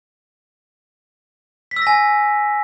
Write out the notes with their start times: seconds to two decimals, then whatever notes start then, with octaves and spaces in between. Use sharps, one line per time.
1.71 B6
1.76 E6
1.82 A#6
1.87 G#5